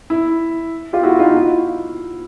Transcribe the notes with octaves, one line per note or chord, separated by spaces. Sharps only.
E4
F4 G4
E4 F#4
D#4 F4
E4